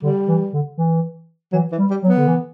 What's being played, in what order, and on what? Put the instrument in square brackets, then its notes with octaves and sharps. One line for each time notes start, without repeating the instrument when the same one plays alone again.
[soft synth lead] D3 [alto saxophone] G3
[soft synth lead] E3
D3
E3
[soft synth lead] E3 [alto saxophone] F#3
[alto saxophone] E3
[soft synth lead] G3
[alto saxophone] G3
[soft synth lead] F#3
[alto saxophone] B3
[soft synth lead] D3
E3